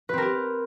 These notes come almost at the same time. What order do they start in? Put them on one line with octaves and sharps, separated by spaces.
B4 C4 A#4 G4